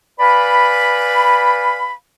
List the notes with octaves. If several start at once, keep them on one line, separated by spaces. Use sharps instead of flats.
B4 D5 F5 G#5 B5